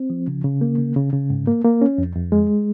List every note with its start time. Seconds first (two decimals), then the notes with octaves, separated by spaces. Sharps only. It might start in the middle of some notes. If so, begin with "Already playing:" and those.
Already playing: C4
0.10 F3
0.28 C#3
0.44 C#3
0.61 A#3
0.78 C#3
0.96 C#3
1.13 C#3
1.30 G#2
1.47 A#3
1.64 A#3
1.82 C#4
1.98 F2
2.16 F2
2.32 G#3